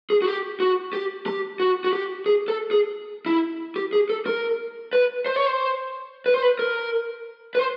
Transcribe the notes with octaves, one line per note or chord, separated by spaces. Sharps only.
G#4
F#4
G4
F#4
G4
G4
F#4
F#4
G4
G#4
A4
G#4
E4
G4
G#4
A4
A#4
B4
C5
C#5
C5
B4
C5
B4
A#4
B4
C5